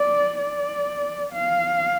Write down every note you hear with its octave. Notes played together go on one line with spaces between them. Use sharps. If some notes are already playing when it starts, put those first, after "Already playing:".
Already playing: D5
D5
F5